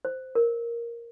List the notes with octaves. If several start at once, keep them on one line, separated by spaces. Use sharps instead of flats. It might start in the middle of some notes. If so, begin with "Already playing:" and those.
C5
A#4